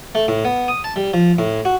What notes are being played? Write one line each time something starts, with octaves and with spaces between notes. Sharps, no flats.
A3
A2
B3
D#6
A5
G3
F3
A2
F#4